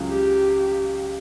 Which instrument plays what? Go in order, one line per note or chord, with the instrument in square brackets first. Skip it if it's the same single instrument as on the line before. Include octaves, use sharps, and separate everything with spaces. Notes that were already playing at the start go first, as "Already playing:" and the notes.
Already playing: [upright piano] C#2 C#3 F#3
[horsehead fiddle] G4